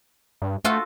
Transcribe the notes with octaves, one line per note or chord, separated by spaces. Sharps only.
G2
A3 F4 F#4 A4